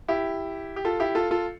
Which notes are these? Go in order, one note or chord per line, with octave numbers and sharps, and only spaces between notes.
E4 G4
G4
F4 A4
E4 G4
F4 A4
F4 A4